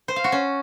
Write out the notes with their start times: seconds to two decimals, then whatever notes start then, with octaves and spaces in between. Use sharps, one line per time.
0.08 C5
0.16 F5
0.24 F#4
0.32 C#4